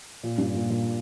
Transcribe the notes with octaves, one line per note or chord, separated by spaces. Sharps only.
A#2
G2
A#2
A#2